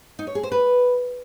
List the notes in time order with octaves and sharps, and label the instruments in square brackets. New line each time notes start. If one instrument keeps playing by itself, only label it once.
[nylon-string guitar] D#4
C#5
G#4
C5
B4